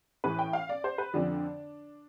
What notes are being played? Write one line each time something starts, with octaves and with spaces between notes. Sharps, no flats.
A2 E3 B4
G5
F5
D5
C5
B4
F2 D3 F3 D4